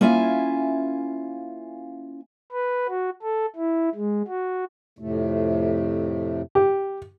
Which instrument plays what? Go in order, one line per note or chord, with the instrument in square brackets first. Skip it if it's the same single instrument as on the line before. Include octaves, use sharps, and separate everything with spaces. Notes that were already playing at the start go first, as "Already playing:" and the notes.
[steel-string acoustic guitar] A#3 C#4 E4 F4 E5 G#5
[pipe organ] B4
F#4
A4
E4
G#3
F#4
[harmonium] F2 A2 C3 A3
[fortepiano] G4